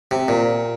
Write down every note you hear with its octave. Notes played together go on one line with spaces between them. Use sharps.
C3
A#2